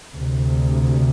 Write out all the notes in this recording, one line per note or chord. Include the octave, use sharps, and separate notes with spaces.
D2 C3